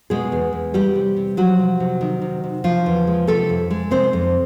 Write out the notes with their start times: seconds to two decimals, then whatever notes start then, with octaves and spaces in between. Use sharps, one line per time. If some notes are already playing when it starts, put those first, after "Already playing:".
0.10 B2 G#3 G#4
0.32 E2
0.53 E2
0.74 E3 G3 G4
0.95 C3
1.16 C3
1.37 F3 F#3 F#4
1.59 C3
1.80 C3
2.01 D#3
2.22 C3
2.44 C3
2.64 C#3 F3 F4
2.86 E2
3.07 G#3
3.27 C3 A3 A4
3.49 F2
3.71 G#3
3.91 C3 C4 C5
4.13 F2